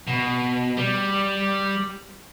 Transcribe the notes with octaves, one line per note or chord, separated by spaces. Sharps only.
B2
G3